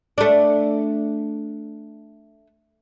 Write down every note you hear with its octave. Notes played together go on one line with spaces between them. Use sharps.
A3 D4